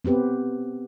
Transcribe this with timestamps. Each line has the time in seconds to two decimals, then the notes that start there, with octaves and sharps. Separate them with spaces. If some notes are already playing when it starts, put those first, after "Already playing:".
0.05 B3 C4 G4 B4